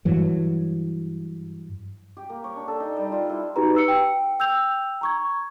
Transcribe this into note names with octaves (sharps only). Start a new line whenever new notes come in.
G2 E3 F#3
G4
A#3
C#5
D4
A4
D#4
G3
F4
E4
D#4 F#4 G4 B4 A#5
B4 E6 C#7
G5
G5 E6 G6 F7
A#5 C#6 G#6